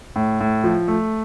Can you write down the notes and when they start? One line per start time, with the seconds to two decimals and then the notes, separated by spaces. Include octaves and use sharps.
0.16 A2
0.41 A2
0.64 F3
0.88 A3